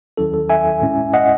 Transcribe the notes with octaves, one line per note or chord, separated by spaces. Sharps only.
D#2 D#3 F#3 C#4 E4 A4
A4
E5 G#5
A2 G#3 C#4 E4
D#5 F#5